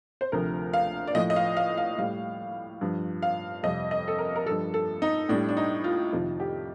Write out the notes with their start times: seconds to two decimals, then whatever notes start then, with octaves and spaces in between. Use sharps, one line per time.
0.21 C5
0.32 D2 C3 F3 A#4
0.73 F5
1.08 D5
1.15 A2 F3 D#5
1.30 D#5
1.36 F5
1.57 F5
1.77 F5
1.98 A2 G3 F5
2.81 G2 F3
3.22 F5
3.63 F2 C3 G3 D#5
3.91 D#5
4.08 A4
4.19 A#4
4.36 A#4
4.46 F3 A4
4.51 G2
4.74 A4
5.02 D#4
5.29 A2 D4
5.33 G3
5.49 D4
5.57 D#4
5.84 F4
6.12 F2 C3 D#3 F4
6.40 G4